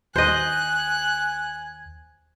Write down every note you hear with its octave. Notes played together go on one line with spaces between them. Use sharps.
D#2 C5 D#5 G#5 F#6